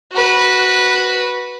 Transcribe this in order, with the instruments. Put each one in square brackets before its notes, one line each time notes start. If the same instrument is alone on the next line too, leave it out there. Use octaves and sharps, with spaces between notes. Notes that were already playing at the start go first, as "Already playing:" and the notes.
[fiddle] F#4 B4